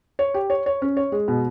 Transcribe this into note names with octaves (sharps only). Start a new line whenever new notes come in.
C#5
G4
C#5
C#5
C#4
C#5
G#3
B2